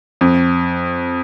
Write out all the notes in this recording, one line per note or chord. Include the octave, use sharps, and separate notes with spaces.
F2